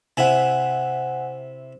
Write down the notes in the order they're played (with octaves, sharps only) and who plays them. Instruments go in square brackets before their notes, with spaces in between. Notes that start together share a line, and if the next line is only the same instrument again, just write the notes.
[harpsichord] C3 E4 [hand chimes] F#5 G#5